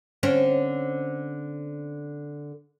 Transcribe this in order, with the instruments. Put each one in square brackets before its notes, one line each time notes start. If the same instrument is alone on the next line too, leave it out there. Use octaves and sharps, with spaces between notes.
[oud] D3 C4 C#4